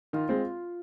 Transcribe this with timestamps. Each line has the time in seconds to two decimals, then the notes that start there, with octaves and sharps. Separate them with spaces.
0.13 D#3 F4
0.29 G#3 C4